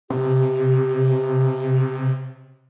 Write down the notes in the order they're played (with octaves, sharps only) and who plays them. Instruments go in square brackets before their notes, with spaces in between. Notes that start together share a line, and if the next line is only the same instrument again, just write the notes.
[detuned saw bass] C3 [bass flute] G4